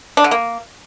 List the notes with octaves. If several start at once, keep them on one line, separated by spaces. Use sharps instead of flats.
D4
D3
A#3